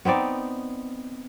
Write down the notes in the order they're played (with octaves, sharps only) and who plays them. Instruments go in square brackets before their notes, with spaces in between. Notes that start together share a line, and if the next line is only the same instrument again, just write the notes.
[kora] B3 C4 D#4 D5